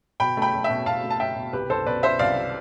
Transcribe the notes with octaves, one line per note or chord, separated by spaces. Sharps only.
B2 G5 B5
A3 G5 B5
A3
E5 G5
B2
B2 F5 A5
A3
A5
A3 E5 G5
B2
C2 G4 B4
C2 A4 C5
B2 B4 D5
B3 C5 E5
C2 D5 F5